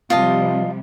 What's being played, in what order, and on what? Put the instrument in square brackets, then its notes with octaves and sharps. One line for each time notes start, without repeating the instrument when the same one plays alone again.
[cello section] C3 F3 G3 [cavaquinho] F4 D#5 A5